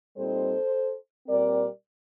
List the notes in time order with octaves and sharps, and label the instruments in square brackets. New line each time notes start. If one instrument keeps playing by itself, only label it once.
[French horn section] A#2 G3 C4 D#4 A4 C5
A#2 G3 C4 A#4 D5